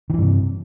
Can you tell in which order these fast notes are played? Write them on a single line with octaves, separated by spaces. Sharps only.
D#3 E3 G2 C3